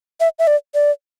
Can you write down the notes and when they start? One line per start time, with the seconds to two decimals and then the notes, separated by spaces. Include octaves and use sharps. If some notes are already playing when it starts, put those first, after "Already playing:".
0.20 E5
0.39 E5
0.47 D5
0.74 D5